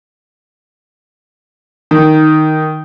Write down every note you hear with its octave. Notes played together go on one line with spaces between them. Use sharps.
D#3